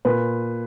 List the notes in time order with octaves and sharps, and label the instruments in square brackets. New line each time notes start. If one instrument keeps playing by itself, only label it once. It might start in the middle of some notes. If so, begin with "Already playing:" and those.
[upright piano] A#2 B4